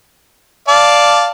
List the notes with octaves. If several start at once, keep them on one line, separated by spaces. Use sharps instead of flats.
D5 F5 A5